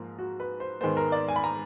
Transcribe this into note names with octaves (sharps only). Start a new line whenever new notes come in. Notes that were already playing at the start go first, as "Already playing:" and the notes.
Already playing: G#2 F3 A#3
F#4
B4
C5
G#2 D#3 G#3 B3 C5
A#4
D5
G#5
B5
A#5